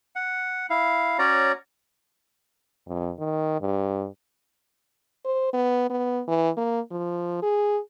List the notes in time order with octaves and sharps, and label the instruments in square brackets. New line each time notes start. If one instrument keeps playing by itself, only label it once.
[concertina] F#5
E4 F5
C#4 F#4 C#5 D5 A#5
[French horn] F2
D#3
G2
[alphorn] C5
B3
B3
E3
A#3
F3
G#4